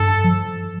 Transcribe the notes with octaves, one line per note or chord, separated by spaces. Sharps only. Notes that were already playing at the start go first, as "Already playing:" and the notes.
Already playing: G2 A4
F3